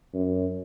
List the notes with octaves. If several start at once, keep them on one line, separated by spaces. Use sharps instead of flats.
F#2